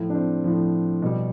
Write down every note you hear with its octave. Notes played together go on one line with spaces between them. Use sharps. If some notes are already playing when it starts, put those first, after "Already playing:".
Already playing: A2 F3
D4
C4
A2 F3
B2 G3